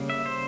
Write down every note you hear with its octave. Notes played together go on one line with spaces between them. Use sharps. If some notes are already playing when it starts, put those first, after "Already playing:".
Already playing: C#3 G3 A#3
E5
C5